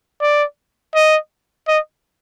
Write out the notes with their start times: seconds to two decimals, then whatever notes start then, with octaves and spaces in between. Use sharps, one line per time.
0.21 D5
0.95 D#5
1.68 D#5